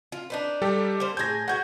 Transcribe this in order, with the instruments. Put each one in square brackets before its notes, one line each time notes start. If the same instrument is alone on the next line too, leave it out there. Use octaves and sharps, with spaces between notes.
[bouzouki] F4
D4 D#4 B4
[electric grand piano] G3 G4 A4
[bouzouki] A#3 C5
[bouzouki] A2 G#4 [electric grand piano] G6 G#6 A#6
[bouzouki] B3 F#4 [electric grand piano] F#5 G6 G#6